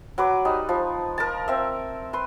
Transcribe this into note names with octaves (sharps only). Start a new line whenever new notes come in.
F#3 B4 D6
G3 D#4
F3
A#4 A5
C4 E5
B4 C6